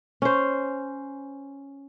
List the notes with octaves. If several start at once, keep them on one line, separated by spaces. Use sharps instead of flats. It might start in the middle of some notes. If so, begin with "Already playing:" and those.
C#4 C5